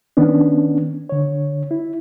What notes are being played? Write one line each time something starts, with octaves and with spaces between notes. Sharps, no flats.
D#3 B3 C#4 D4
D3 C#5
E4